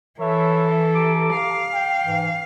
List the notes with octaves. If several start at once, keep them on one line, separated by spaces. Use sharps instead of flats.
E3 A4 B4 C#5 E5
G4 A#5 D6
F5
G5
G#2 E3